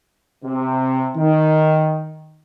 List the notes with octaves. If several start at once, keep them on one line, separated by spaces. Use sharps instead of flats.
C3
D#3